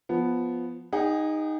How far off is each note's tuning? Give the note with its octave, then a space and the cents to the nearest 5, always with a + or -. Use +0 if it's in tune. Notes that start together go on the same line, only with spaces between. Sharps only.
F3 +5 B3 +0
D#4 +0 G#4 -35 F#5 +35